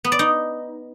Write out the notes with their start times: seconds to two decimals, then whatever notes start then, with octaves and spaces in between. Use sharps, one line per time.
0.04 B3
0.12 D5
0.19 D#4